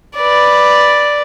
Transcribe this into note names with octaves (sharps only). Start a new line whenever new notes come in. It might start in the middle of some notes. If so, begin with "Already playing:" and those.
B4 D5